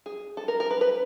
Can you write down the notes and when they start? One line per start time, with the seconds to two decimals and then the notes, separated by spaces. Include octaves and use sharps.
0.06 G#4
0.37 A4
0.48 A#4
0.60 A#4
0.71 B4
0.81 B4